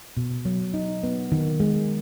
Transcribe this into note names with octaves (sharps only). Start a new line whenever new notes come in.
B2
F#3
D#4
B3
D#3
G#3